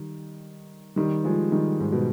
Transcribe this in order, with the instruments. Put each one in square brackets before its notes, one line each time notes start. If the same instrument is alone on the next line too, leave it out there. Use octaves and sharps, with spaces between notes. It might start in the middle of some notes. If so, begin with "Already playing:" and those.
Already playing: [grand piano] D#3 G3
D#3 G3
F3 G#3
D#3 G3
G#2
B2